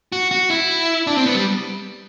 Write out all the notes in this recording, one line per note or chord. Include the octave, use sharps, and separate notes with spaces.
F#4
F#4
E4
D4
C4
B3
G3